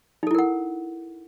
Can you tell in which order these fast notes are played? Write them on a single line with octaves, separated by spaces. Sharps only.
D#4 A4 E4 A#4 F#5